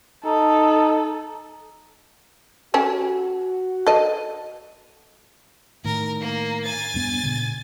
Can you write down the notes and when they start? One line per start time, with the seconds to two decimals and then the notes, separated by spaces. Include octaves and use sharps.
0.25 D#4 A4
2.74 C#4 F#4 G4 A4
3.87 A4 D#5
5.85 A2 D#3 A#4
6.21 A#3
6.64 G#5 A6
6.94 E1 G2 B3
7.23 A#2 C#3